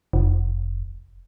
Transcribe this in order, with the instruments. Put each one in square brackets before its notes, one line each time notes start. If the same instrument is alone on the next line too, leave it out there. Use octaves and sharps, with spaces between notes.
[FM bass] F1